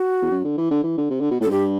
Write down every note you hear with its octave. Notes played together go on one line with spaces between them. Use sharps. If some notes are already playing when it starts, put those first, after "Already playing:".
Already playing: F#4
E2
F#2
D3
E3
D3
E3
D3
C3
D3
B2
A2 A4
F#2
G2 G4